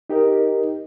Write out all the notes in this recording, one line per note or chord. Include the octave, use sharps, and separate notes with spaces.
D#4 G4 A#4 D#5